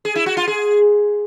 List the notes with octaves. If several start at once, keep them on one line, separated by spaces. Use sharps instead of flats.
G#4
E4
F#4
F4
G#4